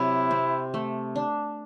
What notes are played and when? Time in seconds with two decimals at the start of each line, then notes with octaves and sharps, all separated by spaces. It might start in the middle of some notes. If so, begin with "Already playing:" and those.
Already playing: C3 F#3 E4
0.31 C4
0.74 A3
1.16 D4